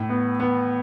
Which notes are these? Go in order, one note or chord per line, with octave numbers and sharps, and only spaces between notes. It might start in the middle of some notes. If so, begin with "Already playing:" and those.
Already playing: A2
B3
B3